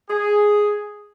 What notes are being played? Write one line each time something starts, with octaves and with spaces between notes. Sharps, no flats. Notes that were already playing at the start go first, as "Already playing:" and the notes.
G#4